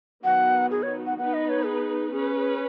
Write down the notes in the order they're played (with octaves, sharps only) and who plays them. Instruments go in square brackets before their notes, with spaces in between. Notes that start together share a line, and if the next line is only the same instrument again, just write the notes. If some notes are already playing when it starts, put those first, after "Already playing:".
[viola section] D#3 F#3 B3 D#4 F#4 [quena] F#5
[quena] G#4
C#5
F#5
[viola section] B3 D#4 B4 [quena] F#5
[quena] D#5
C#5
G#4
[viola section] C#4 B4 [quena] G#4
[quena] G#4